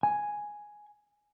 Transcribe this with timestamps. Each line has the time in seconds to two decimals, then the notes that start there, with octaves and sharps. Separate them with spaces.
0.03 G#5